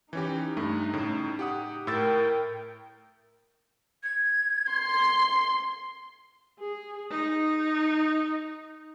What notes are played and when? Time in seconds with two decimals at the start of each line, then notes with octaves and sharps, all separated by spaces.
0.13 E3 C#4 D#4 G4
0.57 G2 A3
0.94 A2 C#3
1.39 G4 F#5 D#6
1.87 A2 A#4 G5 E6 A6
4.03 G#6
4.70 C6
6.59 G#4
7.11 D#4